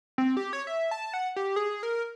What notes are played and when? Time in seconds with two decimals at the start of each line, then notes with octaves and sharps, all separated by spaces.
0.18 C4
0.37 G4
0.53 C#5
0.67 E5
0.91 A5
1.14 F#5
1.36 G4
1.56 G#4
1.83 A#4